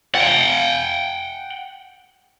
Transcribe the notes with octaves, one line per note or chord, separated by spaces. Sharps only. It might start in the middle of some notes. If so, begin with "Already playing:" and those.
F#5 G5